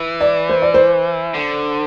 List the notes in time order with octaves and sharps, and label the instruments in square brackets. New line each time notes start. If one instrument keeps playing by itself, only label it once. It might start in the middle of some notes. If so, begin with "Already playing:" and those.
Already playing: [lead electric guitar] E3
[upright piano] D5
C5
D5
C5
[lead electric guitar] D3